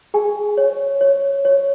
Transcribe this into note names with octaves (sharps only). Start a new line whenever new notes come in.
G#4 G#5
C#5
C#5
C#5